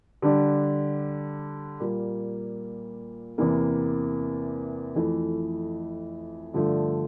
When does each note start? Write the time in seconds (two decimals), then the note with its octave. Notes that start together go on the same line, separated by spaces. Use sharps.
0.22 D3 G3 D4 G4
1.80 A#2 G3 A#3
3.38 E2 C3 E3 A#3
4.95 F2 E3 A3
6.53 G2 D3 F3 A3